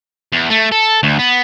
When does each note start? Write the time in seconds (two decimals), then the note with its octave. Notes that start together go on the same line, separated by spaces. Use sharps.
0.33 E2
0.50 A3
0.72 A4
1.03 D2
1.19 B3